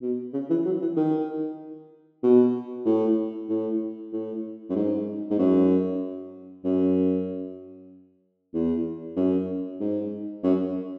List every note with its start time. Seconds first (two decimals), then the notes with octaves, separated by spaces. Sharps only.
0.02 B2
0.33 C#3
0.50 E3
0.65 F#3
0.82 E3
0.96 D#3
2.23 B2
2.86 A2
3.49 A2
4.13 A2
4.70 F#2
4.76 G#2
5.31 G#2
5.39 F#2
6.64 F#2
8.54 E2
9.16 F#2
9.80 G#2
10.43 F#2